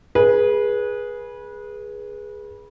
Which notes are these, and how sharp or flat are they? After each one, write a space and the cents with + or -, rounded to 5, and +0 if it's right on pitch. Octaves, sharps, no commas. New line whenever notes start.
G#4 +0 B4 -25